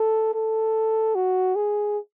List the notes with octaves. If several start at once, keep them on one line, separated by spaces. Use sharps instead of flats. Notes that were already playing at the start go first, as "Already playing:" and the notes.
Already playing: A4
A4
F#4
G#4